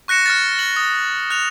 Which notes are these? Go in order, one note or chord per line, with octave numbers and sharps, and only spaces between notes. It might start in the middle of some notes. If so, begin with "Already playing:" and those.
C#6 F#6 A#6 C#7 E7
F6 F#6 A6
F#7
D#6
F#6 F7